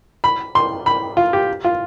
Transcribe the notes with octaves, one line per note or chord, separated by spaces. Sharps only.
B5
C6
B5
F4
G4
F4